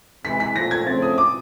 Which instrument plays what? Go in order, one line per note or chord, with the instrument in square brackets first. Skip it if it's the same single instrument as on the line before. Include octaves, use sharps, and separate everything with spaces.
[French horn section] C3 E3 G#3 [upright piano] B6
[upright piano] B6
[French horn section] A#2 F3 A3 [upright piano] A#6
[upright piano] G#6
[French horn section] C#3 F3 A3 C4 [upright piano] A6
[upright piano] D#6
D6